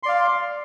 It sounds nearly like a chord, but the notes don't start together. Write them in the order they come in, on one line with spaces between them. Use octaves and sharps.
C6 D5 F5